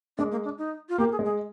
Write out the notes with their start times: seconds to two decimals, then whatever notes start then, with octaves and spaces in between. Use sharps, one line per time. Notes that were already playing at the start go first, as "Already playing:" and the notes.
0.18 G#3 D4
0.32 A#3
0.45 D4
0.58 D#4
0.89 F4
0.98 A#3 G4
1.12 G#4
1.19 G#3
1.25 G#4